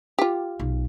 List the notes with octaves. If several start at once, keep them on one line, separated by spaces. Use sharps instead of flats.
F4 G4
B1